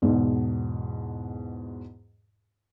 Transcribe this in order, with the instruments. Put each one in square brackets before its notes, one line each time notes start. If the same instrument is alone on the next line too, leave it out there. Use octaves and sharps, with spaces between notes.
[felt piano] E2 G#2 B2